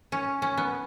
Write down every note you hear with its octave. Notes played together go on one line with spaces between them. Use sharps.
C#4
C#4
B3